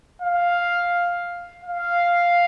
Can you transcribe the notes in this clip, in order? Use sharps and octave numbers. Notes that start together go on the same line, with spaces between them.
F5
F5